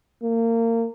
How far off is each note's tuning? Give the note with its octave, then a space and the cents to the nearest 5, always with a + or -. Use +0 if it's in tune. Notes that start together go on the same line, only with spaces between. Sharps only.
A#3 -30